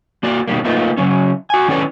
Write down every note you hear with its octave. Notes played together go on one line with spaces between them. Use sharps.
A#3 F#4 D5
B2 D#3 G3 A#3
A3 A#3 D#4 F4 B4
C#3 F#3 C#4
F#4 G#5
D#3 C#4 E4 A4 B4 D5